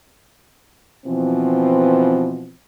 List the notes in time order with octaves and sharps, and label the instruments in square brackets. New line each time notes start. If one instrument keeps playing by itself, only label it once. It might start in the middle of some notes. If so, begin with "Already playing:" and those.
[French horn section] B2 E3 F3 C4